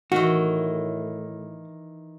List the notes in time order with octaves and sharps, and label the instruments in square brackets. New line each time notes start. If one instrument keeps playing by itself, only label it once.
[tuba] A2 [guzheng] D#3 E3 [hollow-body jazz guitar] F#4